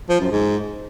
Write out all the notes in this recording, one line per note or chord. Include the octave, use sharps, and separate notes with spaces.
F3
F#2
G#2